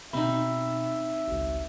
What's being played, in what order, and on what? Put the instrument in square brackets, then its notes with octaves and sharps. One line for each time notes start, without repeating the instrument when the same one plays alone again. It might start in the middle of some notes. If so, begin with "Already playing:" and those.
[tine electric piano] B2 B5 [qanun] C4 D#4 [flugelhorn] E5
[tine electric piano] G#1 C#2